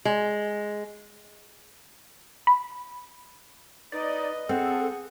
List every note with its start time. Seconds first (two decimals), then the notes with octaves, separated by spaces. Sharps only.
0.05 G#3
2.47 B5
3.92 D#4 B4 D5 D#5
4.49 C4 G#4 A4 F#5